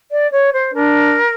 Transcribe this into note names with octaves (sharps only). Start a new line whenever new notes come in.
D5
C#5
C5
D4 A#4